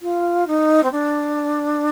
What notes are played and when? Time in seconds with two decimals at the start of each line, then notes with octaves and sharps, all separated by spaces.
0.02 F4
0.47 D#4
0.83 C4
0.92 D4